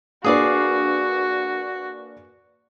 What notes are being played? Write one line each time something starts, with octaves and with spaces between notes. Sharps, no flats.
A#3 D4 F#4 G#4 B4 D5 F5